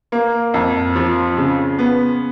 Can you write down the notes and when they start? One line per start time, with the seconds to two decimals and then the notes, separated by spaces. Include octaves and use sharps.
0.12 A#3
0.54 F2
0.95 F3
1.37 C#3
1.79 B3